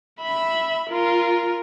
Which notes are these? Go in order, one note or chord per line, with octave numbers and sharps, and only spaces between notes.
E5 B5
F4 A#4